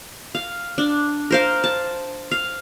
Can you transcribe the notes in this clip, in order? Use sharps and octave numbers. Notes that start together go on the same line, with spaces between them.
F5
D4
A#4 C5 F5
A5
F5